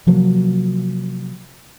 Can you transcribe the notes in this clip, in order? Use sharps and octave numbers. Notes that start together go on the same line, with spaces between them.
C3 F3 F#3 A#3